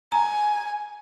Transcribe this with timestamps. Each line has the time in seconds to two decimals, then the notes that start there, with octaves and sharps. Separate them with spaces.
0.12 G#5 A#5